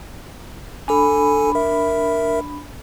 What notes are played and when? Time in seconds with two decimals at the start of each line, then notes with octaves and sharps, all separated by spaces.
0.88 D4 A4 G#5 B5
1.55 A#4 E5